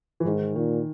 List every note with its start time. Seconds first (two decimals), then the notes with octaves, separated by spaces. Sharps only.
0.20 E3
0.25 G#2 D#3
0.56 A#2 D#3